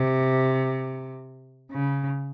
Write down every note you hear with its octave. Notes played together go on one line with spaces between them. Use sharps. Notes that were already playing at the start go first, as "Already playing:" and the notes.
Already playing: C3
C#3